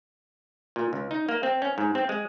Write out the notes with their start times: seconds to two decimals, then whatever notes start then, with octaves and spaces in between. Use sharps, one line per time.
0.76 A#2
0.93 C#2
1.11 D#4
1.29 A#3
1.43 C4
1.62 C#4
1.78 G#2
1.95 C4
2.09 G#3